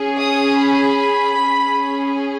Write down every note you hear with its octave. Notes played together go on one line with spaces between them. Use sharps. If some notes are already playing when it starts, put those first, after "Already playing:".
Already playing: C#4 G#4
D#6
B5
C#4 G#4